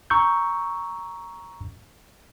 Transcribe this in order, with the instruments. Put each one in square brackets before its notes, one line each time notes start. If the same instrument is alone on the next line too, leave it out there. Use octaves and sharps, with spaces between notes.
[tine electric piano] A#5 C#6 E6 G6